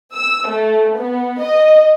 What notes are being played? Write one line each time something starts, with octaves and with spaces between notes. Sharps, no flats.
E6
A3
B3
D#5